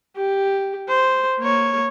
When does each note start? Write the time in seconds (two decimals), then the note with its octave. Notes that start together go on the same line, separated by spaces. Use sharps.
0.17 G4
0.89 C5
1.40 A#3 C#5